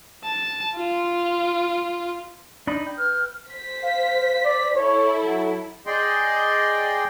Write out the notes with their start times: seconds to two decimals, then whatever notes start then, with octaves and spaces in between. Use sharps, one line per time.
0.24 A5
0.76 F4
2.67 D4 D#4 B5
2.87 G5
2.98 B4 F6
3.50 C5 B6
3.84 F5
4.45 D5
4.76 E4 A4 C#5
5.25 F#3
5.87 G#4 D5 D#5 G5 C6